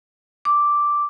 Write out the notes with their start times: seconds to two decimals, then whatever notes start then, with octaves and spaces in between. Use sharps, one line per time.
0.45 D6